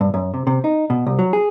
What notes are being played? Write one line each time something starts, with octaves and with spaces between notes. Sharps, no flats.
G2
F#2
C3
C3
D#4
B2
C2
F#3
G#4